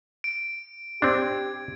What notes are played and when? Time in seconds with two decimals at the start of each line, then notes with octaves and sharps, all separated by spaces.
0.24 D7
1.02 C4 D4 G4 G#6